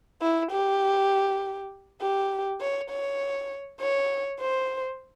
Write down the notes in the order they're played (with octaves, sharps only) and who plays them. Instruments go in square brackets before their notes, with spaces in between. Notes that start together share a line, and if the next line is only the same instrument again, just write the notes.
[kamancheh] E4
G4
G4
C#5
C#5
C#5
C5